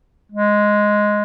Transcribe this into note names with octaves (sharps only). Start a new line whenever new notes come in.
G#3